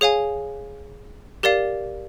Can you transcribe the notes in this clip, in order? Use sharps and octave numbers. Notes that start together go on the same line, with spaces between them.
G#4 C#5 F5 G#5
G4 A#4 D5 F5